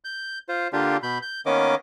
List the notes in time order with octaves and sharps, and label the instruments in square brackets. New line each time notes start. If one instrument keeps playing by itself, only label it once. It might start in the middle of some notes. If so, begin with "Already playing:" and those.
[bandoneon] G6
F4 C5
D3 A#3 D4 F4 G4
B2 B5 G6
G6
D#3 A#3 B3 C#4 D#5 D6